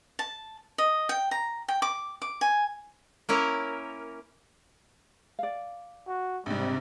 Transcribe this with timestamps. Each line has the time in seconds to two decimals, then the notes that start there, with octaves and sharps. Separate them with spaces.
0.19 A5
0.78 D#5
1.09 G5
1.31 A#5
1.68 G5
1.82 D6
2.22 D6
2.41 G#5
3.29 A#3 C#4 E4 A#4
5.39 D5 F5
6.07 F#4
6.46 A#1 G#2 C3 G3